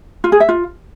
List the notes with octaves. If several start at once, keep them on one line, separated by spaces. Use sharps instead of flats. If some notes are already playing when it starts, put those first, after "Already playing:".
F4
G#4
E5
F4